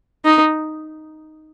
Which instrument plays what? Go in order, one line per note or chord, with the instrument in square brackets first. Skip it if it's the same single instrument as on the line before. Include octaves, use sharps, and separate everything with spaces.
[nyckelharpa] D#4